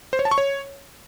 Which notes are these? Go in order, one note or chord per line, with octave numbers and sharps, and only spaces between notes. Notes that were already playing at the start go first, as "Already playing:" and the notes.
C5
C#5
A5
C#6
C#5